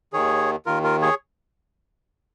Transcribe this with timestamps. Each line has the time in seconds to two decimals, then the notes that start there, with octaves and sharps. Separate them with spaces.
0.13 D#2 D#3 G#4 C#5
0.66 D#2 D#3 F4 A#4
0.84 F4 A#4
1.02 G#4 C#5